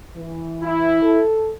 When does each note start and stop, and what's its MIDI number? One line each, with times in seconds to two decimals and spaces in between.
0.16 0.99 52
0.63 1.21 64
1.02 1.50 69